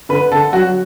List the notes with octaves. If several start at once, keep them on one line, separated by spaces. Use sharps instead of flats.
D3 B4
D3 A4
F#3 F#4